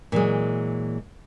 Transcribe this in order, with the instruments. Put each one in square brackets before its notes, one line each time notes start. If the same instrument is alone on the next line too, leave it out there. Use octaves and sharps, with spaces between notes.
[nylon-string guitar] A#2 E3 F#3 G#3